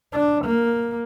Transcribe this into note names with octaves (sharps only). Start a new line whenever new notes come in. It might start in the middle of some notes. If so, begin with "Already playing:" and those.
D4
A#3